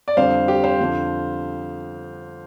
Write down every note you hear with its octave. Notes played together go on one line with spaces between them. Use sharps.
D5
F2 D3 G3 C4 C5 F5
G4
C5 F5
F2 D3 F3 C4